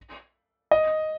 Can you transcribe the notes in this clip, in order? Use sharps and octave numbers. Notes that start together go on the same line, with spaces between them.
D#5